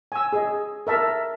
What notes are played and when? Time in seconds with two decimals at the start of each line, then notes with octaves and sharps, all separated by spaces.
0.12 G#5 E6
0.33 G#4 D#5
0.87 A#4 E5 A5